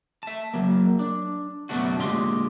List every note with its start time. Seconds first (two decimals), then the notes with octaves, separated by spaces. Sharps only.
0.23 E5 A5
0.54 F#3 A#3
0.99 D4
1.69 F#2 B2 F#3 A3 D4 F#4
1.98 A#2 D3 G#3 G4 C6